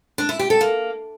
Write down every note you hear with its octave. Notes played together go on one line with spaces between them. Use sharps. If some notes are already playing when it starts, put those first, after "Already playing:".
D4
E4
G4
A4
A#3